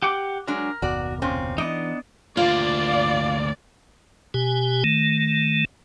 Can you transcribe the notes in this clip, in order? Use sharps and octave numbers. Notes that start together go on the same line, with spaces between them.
G4 F#5 D6
F#3 G#3 D4 A#4
F#1 D#2 B2 F#4 D5
A#2 C4 C#4
E3 B3 D4 D#4 D#5
D2 A#3 F4 D5 F5
B2 G4 G#5
D#3 A3